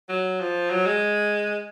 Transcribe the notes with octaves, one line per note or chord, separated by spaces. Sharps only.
F#3
F3
F#3
G#3